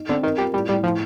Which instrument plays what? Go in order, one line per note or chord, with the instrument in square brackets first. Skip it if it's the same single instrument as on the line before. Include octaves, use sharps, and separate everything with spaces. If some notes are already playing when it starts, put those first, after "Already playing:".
Already playing: [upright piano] D#4
[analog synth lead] D3 [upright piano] C4
[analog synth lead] D#3 [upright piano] A#4
[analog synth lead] G3 [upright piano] F4
[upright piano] A2 [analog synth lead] G3
[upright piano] A2 [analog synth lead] G3
[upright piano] A2 [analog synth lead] F3